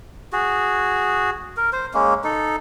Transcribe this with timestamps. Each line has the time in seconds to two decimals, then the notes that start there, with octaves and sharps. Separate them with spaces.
0.33 F#4 G#4
1.57 A#4
1.73 C5
1.94 G#3 A#3 C#4
2.24 D#4 A4